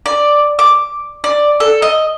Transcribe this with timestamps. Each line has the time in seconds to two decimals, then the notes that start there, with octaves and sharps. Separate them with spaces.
0.06 D5
0.59 D6
1.24 D5
1.60 A4
1.82 D#5